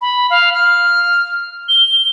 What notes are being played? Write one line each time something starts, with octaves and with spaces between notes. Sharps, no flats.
B5
F5
F6
G7